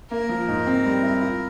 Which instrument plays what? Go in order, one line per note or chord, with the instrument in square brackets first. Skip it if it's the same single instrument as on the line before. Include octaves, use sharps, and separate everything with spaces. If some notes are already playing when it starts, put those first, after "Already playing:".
[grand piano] A#3 [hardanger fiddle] A#4
[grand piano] F3
G#2
C4
G3
E4
F4